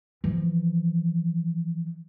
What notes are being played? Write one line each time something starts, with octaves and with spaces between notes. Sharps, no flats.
E3 F3